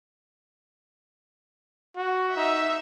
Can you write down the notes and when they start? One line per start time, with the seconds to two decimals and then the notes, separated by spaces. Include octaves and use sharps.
1.96 F#4
2.36 D#4 E5